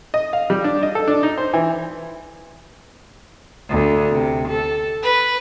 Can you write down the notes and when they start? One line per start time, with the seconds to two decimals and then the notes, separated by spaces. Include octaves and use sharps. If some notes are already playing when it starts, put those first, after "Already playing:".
0.14 D#5
0.33 F5
0.50 G3
0.64 D4
0.83 D#5
0.95 A4
1.08 D4
1.23 D#4
1.38 C5
1.53 E3
3.69 D2
4.13 C3
4.48 A4
5.03 B4